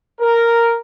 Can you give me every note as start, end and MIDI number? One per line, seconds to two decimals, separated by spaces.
0.21 0.76 70